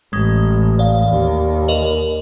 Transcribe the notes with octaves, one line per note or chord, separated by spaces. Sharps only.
A1 G#3
D5 F5
D#2
A#4 D#5 F#7